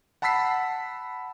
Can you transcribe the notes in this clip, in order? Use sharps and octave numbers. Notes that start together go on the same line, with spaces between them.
F#5 A5 B5 E6 B6 C7